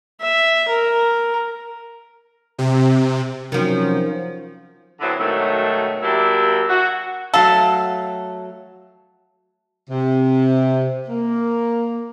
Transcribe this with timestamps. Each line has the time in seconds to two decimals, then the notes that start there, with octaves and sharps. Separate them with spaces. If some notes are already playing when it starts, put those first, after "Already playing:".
0.21 E5
0.69 A#4
2.58 C3
3.52 C3 D#3 F3 F#3 C#4
5.01 D3 F#3 B3 C4 E4
5.18 G#2 B2 D#3 F#3 A3
6.02 F#3 A#3 D4 E4 G4 E5
6.69 F#4
7.34 F#3 A3 A4 F5
9.89 C3
11.09 A#3